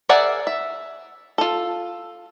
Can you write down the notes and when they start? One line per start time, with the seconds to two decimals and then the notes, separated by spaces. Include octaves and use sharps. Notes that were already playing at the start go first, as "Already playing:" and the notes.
0.09 G#4 A#4 D5 E5 F#5
0.47 E5
1.38 F4 A4